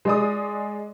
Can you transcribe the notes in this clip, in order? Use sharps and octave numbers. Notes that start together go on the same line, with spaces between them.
G#3 D5 D#6